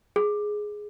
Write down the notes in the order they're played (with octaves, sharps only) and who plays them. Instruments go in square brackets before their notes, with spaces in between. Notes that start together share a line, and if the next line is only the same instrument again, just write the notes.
[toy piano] G#4